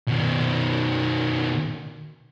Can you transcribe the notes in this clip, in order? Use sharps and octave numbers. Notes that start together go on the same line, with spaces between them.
B2 D#3